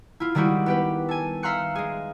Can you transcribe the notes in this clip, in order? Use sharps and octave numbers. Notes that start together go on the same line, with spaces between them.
E4 F4
D#3 G3 G#3 E4 F#4 G4
B3 G4 B4
A4 G#5
E5 F5 A#5 C6 F#6 C#7
G#3 G#4